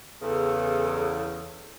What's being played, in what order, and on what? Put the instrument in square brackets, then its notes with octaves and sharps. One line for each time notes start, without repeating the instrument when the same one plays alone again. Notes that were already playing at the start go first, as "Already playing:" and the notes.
[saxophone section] E2 C#3 [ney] A4